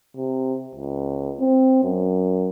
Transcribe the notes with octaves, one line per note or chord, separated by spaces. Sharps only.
C3
C#2
C4
F#2